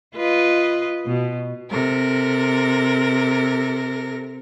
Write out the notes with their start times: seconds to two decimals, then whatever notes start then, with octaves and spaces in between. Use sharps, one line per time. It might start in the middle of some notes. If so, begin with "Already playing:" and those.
0.16 F4 B4 D#5
1.06 B2
1.70 C3 A4 A#4 A#6